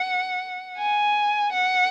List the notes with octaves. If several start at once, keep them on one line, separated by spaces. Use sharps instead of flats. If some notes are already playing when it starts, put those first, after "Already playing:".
Already playing: F#5
G#5
F#5